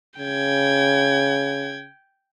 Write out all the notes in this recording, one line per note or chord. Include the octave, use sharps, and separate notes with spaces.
C#3 G5 G#6